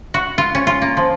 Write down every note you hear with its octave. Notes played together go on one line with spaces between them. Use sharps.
F#4
F4
C#4
F4
A#3
F3